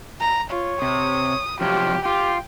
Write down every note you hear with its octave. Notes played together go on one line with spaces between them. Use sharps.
A#5
F4 C#5
C3 D#6
F2 C3 F#3 F4 G4
F4 G4 G5